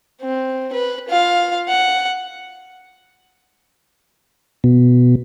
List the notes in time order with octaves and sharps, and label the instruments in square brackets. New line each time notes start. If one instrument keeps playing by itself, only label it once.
[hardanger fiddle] C4
B4
F4 F5
F#5
[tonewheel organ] B2